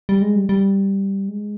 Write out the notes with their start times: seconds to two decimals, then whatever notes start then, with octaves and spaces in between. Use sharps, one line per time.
0.09 G3
0.22 G#3
0.36 G3
0.49 G3
1.29 G#3